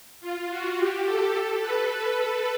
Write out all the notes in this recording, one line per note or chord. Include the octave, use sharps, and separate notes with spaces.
F4
F#4
G4
A4
A4
B4